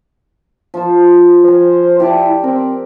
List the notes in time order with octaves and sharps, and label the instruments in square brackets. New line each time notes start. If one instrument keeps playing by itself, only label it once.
[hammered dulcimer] F3 F4 C5
[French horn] C5 [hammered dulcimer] G#5 A#5
[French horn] E4 [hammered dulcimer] G4 D5 A5
[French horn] C4 [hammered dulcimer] A#4